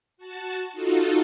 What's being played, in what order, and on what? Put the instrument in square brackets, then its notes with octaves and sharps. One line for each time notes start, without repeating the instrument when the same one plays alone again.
[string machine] F#4 A5
D#4 F4 F#4 A4